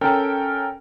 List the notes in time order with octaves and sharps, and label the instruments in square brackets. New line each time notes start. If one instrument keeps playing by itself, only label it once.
[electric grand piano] C#4 A4 A#4 G5